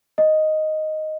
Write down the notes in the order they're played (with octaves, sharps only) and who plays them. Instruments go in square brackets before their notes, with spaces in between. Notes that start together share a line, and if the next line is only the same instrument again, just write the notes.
[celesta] D#5